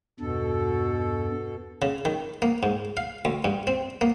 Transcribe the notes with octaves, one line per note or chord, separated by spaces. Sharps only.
E2 G2 B2 A4
C#3
D#3
A#3
G#2
F5
D2
G2
C4
A#3